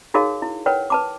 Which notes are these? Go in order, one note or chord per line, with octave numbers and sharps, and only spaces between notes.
D#4 F#4 G#4 A#4 C#5 F5
E4
A#4 B4 C#5 F#5 G5
B4 A5 D6